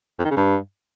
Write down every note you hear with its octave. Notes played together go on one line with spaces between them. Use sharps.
F2
D#3
C#3
G2